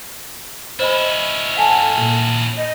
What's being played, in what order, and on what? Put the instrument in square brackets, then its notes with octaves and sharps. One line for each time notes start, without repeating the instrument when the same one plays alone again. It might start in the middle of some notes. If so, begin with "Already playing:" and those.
[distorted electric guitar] C#4 E4 [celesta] C5 D#5 B5
[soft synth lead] A4 [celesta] F#5 G#5 A5
[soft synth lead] A#2
[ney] D#5